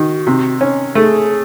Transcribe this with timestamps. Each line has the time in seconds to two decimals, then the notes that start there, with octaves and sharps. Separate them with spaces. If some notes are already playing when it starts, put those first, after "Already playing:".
Already playing: D#3 F#4
0.27 C3
0.61 C#4
0.95 A3 G#4